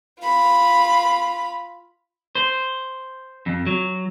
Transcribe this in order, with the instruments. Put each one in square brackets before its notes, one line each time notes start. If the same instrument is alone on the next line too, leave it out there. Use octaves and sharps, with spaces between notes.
[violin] F4 B5
[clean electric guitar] C5
F2
F#3